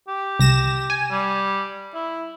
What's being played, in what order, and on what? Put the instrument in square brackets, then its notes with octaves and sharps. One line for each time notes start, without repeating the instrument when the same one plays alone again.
[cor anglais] G4
[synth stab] C2 A#6 E7
G#5
[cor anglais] G3
E4